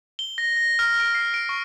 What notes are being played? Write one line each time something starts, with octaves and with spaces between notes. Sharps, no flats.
G7
A#6
A#6
F6
D7
C7
D7
C#6